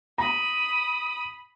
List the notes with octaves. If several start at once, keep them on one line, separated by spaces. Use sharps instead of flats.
A#5 B5 D#6